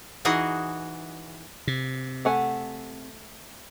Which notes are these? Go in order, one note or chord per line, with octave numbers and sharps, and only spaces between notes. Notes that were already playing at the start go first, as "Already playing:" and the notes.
E3 D#4 F#4 G#4
C3
A3 F#5 G#5